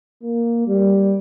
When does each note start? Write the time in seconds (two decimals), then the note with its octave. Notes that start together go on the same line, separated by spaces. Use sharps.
0.23 A#3
0.66 G3